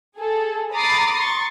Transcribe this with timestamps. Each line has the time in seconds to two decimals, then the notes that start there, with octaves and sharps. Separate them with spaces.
0.17 G#4 A4
0.74 A#5 B5 D6 D#6 A6 C7
1.18 C6 C#6 A6